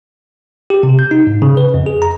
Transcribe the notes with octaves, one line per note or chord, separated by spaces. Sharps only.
G4
C3
G6
D#4
G#2
C#3
B4
F2
G#4
A#5